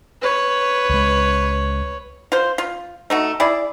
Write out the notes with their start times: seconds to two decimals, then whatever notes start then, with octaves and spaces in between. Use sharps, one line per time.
0.22 B4 C#5
0.90 C#2 G#3
2.32 F4 C5
2.58 F4
3.10 A3 D#4 F#4
3.40 E4 G#4 D5